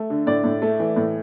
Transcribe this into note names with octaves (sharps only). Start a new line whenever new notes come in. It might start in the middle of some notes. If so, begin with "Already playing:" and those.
Already playing: A3
D3
A2 D5
A2
A3
E3
A2